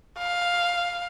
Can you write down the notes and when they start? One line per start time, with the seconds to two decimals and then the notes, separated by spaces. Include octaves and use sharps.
0.18 F5